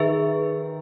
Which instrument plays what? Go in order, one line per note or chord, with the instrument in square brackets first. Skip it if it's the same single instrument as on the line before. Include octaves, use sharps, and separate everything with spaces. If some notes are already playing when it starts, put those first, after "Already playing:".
Already playing: [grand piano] D#3 [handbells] G#4 B4 E5